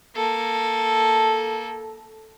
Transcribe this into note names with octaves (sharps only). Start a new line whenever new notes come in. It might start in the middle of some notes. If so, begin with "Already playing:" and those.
A#3 A4